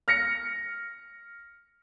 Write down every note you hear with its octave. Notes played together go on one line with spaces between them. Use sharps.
F6 A#6 C#7